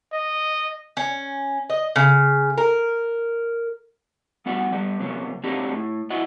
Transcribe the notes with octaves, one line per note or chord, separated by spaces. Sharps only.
D#5
C#4
D#5
C#3
A#4
G3 B3 F#4 F#5
G3 B3
C3 F#3 A#3 B3
A#3 C4 D4 D#4 F#4 G4
A2
E4 F#4 D#5 F#5